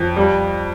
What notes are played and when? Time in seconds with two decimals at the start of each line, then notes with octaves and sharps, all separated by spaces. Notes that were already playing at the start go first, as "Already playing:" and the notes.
Already playing: F2
0.16 G3